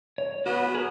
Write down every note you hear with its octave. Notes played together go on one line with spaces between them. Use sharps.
C#5
B3 F#4
G#4 A#4 B4